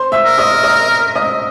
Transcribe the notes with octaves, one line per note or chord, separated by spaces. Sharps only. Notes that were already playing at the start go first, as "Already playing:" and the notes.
Already playing: C5 C6
E5 E6
A#4
D#5 D#6
D#5 D#6
D#5 D#6